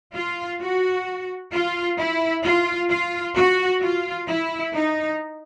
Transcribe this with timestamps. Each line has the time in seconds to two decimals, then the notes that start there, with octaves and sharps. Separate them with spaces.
0.14 F4
0.60 F#4
1.51 F4
1.97 E4
2.43 F4
2.89 F4
3.35 F#4
3.81 F4
4.27 E4
4.73 D#4